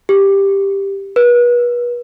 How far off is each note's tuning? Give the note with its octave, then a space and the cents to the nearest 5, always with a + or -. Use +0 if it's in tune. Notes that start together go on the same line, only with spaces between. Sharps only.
G4 +5
B4 -35